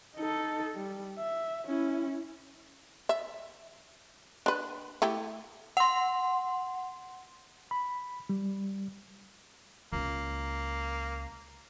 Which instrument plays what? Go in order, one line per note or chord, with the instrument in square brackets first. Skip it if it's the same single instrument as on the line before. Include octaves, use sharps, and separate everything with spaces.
[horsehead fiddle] D#4 A4
G3
E5
C#4 E4
[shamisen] E5
D4 B4
A3 E4 G4
[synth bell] F#5 C6
[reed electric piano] B5
G3
[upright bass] C#2 [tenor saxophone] A#3